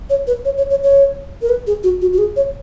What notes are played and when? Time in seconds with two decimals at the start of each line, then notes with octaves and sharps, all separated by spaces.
0.10 C#5
0.27 B4
0.45 C#5
0.58 C#5
0.70 C#5
0.83 C#5
1.42 A#4
1.49 B4
1.67 G#4
1.84 F#4
2.02 F#4
2.13 F#4
2.18 G#4
2.36 C#5